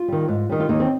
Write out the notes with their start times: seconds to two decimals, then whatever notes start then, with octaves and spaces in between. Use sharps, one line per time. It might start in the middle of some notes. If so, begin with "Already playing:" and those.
Already playing: F4
0.08 D#3 G3
0.28 G#2
0.49 D#3 G3
0.60 F4
0.69 D#2 D#4
0.80 C4